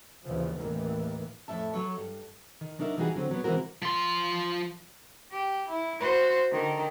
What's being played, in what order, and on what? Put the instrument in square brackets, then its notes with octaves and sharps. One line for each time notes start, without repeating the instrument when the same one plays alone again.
[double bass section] A#1 D#2 C#3 E3 F3
A1 D#2 D#3 E3 A#3
[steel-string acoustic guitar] F2 A2 E5 A5
F#3 A4 C#5
G2
[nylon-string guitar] D#3
F#3 D4 D#4 A#4 E5
E3 G3 D#4 F#4 G#4
D3 F#3 C4
F#3 B3
C#3 E3 G#3 C4 F#4 A#4
[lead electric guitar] F3 C6
[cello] G4
E4
F#4 C5
D3 D#3